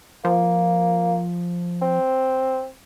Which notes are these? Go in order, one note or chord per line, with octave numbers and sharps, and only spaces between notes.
F3 A#3
C4